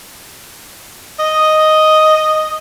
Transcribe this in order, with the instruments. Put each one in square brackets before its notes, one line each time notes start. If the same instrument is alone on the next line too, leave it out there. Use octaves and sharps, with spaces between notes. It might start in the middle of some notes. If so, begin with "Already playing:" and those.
[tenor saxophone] D#5